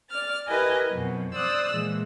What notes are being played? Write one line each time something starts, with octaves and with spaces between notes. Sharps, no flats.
D5 F6 A6
E4 G4 A#4 B4 D#5 G#5
F2 B2 F3 F#3
C5 D5 D#6 E6 F#6
A#2 E3 F3 G#3